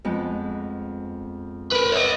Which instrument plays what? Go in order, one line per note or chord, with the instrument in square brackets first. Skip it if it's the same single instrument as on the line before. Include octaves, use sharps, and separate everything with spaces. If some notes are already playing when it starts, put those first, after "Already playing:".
[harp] F2 G#3 B3
[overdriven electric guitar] A#4 B4
C#5 D#5